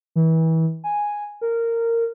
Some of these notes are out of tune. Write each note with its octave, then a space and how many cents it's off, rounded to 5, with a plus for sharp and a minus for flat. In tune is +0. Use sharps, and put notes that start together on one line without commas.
E3 -30
G#5 -5
A#4 -15